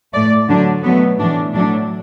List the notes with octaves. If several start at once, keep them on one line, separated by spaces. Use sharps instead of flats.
A2 A3 D5
D3 F#3 A3 D4
B2 F#3 A3 B3
A2 E3 A3 D4
A2 F#3 A3 D4